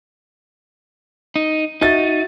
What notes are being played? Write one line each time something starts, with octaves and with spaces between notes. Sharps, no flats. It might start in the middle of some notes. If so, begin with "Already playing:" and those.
D#4
D#4 F#4 E5 A6